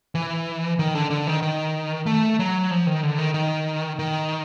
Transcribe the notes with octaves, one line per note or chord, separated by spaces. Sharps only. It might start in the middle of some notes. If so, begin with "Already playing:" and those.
E3
D#3
D3
D3
D#3
D#3
A3
F#3
F3
D#3
D3
D#3
D#3
D#3